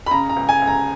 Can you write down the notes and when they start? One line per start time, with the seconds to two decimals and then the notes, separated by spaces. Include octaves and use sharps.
0.06 B5
0.11 C#3 A#5
0.29 A#5
0.36 C#2
0.49 G#5
0.62 C#2
0.67 A#5